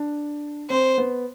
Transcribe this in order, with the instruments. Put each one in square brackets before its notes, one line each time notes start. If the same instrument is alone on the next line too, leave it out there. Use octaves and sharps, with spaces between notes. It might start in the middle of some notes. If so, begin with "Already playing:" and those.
Already playing: [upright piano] D4
[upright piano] C4 [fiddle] C5
[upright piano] B3